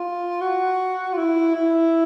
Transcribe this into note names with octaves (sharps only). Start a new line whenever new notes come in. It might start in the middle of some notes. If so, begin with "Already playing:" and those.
Already playing: F4
F#4
F4
E4
E4